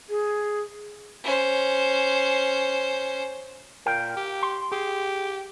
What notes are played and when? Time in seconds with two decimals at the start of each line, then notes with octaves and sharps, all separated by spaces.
0.09 G#4
1.24 C#4 C5
3.86 A#2 A#4 F5 G5
4.17 G4
4.43 C6
4.72 G4 G#4